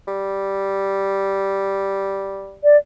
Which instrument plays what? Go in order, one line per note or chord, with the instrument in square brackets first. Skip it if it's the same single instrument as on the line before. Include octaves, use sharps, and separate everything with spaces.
[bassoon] G3
[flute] D5